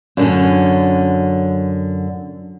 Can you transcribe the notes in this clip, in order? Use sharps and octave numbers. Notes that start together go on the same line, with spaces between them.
F#2 D3 C#4